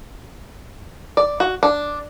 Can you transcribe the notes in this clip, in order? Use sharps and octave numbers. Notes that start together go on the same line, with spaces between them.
D5
F#4
D4